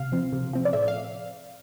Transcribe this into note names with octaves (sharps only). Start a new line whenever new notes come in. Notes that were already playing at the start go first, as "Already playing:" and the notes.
Already playing: C3 F5
F3 C4
C3
F3 C4
D5
A2 E5
F5